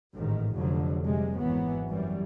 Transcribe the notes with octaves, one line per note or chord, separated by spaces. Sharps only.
A1 G#2 D#3
F1 F2 D3 F#3
F1 C3 G3 G#3
G#1 E3 F#3 B3
F#2 E3 G3